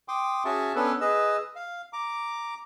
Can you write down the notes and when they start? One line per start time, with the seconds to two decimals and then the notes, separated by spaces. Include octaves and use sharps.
0.08 G5 C6 D6 D#6
0.45 C#4 F#4 G#4 E5 A5 C#6
0.75 B3 C#4 D4 A4 B4
1.01 G#4 B4 D#5 E6
1.56 F5
1.93 A#5 D6